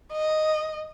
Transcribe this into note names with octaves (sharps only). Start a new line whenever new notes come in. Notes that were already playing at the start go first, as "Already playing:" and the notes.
D#5